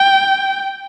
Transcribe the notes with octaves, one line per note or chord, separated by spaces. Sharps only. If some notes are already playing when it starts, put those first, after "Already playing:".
Already playing: G5